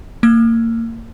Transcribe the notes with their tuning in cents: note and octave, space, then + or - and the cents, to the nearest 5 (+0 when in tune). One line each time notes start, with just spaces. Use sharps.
A#3 -30 E6 +30